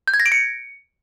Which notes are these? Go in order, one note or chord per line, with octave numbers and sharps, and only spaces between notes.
G6
G#6
A#6
D7
C#7